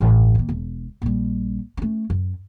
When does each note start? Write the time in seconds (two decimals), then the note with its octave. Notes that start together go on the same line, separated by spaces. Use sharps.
0.01 A1 G2
0.35 D#3 A#3
0.49 E1
1.02 A#1 G3
1.77 A3 C#4
2.10 F#2